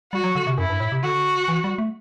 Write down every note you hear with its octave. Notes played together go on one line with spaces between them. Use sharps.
G3 F#4
F#3
D3
C3
F#2 E4
G2
A2
C3
D3 F#4
E3
G3
A3